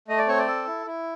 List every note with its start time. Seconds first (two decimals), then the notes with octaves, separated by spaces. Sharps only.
0.08 A3 D#5
0.18 D5
0.28 C4 C#5
0.38 D5
0.47 A4
0.67 E4
0.86 E4